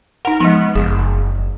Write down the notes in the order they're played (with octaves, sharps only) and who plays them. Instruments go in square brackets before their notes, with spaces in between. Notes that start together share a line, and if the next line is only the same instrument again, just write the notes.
[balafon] D#4 F#5 [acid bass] A#4
[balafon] F3 G#3 [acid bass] B3
[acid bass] F#1 [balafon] G#4